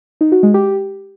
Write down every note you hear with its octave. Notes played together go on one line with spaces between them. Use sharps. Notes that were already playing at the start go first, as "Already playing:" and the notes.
D#4
F#4
G#3
G4